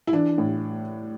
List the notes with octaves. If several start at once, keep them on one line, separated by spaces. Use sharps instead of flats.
E4
E3 D4
A2